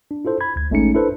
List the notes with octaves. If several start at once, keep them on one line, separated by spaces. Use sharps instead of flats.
D4
E4 F4 A4 C5
B5 G#6
D2 G#6
A1 G#3 A3 C#4 D#4 C#7
D4 E4 A4 B4 C5